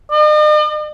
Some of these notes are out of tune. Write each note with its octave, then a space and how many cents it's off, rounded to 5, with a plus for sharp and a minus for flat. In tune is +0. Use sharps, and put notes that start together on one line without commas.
D#5 -45